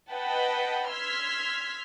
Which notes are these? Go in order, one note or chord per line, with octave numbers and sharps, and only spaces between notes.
B4 D#5 F#5 G5 A5 B5
C6 E6 F6 G#6 B6